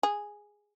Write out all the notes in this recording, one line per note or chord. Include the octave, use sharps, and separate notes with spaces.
G#4